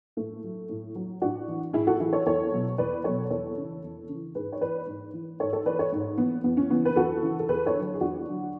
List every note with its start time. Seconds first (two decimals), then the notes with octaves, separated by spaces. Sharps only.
0.17 A2 A3
0.44 F#3
0.69 A2
0.95 F#3
1.22 A2 D4 F#4
1.48 E3
1.73 A2 E4 G#4
1.87 F#4 A4
2.00 E3 E4 G#4
2.13 A4 C#5
2.26 E2 A4 C#5
2.52 B2 F#3
2.78 E2 B4 D5
3.04 B2 F#3 A4 C#5
3.30 E2 A4 C#5
3.57 C#3 E3
3.83 E2
4.09 C#3 E3
4.35 G#2 G#4 B4
4.53 C#5
4.61 E3 B4 D5
4.87 G#2
5.13 E3
5.40 G#2 A4 C#5
5.53 A4 C#5
5.66 E3 B4 D5
5.79 A4 C#5
5.92 G#2
6.18 E3 B3
6.44 E2 B3
6.57 C#4
6.70 C#3 E3 B3
6.85 B4
6.96 E2 F#4 A4
7.22 C#3 E3
7.39 A4
7.49 E2 G#4 B4
7.66 A4 C#5
7.74 D3 F#3
7.94 G#4
8.00 E2 D4 F#4
8.27 D3 F#3